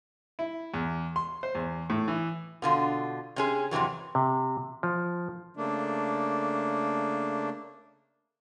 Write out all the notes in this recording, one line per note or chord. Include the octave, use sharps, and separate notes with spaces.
E4
E2
C6
C5
E2
A2
E3
B2 D3 F4
C3 C#4 G#4
F2 G#2 C3 E3 F#3
C3
F3
C#3 A3 A#3 D4